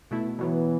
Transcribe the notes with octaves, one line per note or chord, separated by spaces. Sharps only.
B2 A3 E4
B2 E3 F#3 B3